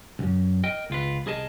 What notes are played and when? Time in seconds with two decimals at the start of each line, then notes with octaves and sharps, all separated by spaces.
0.19 C2 F#2
0.64 A#4 D#5 G5
0.90 C#2 F4 B4
1.26 C2 G#4 A#4 D#5 A5